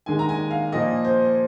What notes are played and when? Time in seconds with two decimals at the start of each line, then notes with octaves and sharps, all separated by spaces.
0.06 D#2 D#3 G#3 G#5
0.19 A#5
0.29 G#5
0.51 F5
0.72 A#2 F3 A#3 D#5
1.04 C5